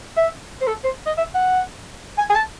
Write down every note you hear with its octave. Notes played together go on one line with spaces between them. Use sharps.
E5
C5
A4
C5
D#5
E5
F#5
G#5
G#5
A5